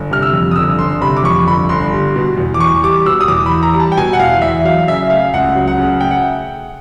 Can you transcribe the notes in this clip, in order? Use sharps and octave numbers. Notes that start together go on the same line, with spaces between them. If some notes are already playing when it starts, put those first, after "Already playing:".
Already playing: G1
C3 F6
E6
F2
D#6
G1 E6
G1 C6
C3 B5
D6
F2 C#6
G1 B5
G1 C6
G3
B2
E2
D6
E2 C#6
G3 D6
B2 E6
D#6
E2 D6
B5
E2
A#5
G3
A5
G5
B2 G#5
F#5
E2 F5
E2 E5
F#3 F5
C#3 E5
A3 F5
C#2 F#5
F#3
F#5
C#3
A3 G5
F#5